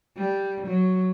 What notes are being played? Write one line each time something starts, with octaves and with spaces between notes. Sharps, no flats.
G3
F#3